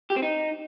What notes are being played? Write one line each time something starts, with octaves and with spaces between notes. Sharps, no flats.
G4
C4
D#4